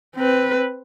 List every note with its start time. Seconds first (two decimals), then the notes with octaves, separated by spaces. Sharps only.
0.15 C4 B4